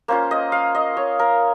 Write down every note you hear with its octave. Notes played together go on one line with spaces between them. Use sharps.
A#3 C#4 F4 C5
D#5
F5
D#5
C#5
A#4